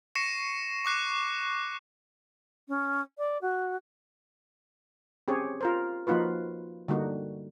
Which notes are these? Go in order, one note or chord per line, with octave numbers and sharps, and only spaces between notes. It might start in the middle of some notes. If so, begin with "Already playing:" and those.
C#6 A#6 C7 C#7 D#7 E7
C#6 D6 F#6 C7
C#4
D5
F#4
C4 C#4 G4 G#4 C#5
F4 A#4 C5
F3 A#3 D#4 F4 F#4 B4
D3 G3 A#3 D#4 F#4